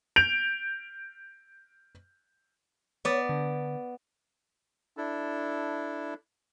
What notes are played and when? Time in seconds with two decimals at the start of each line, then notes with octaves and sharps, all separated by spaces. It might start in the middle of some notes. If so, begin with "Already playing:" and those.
0.16 G6 D7 F7
3.05 B3 C#5 D5
3.29 D3
4.97 D4 E4 A4